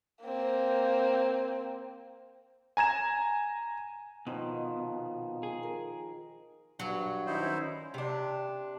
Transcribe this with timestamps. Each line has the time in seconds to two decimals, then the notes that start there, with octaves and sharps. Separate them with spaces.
0.24 A#3 C4
2.77 G#5 A#5 G#6 E7
4.27 B2 D#3 F3 A#4
5.43 G#4
5.63 A#4
6.79 G2 F#3
7.26 D#3 C#4 D#4 E4 C5
7.94 C3 D4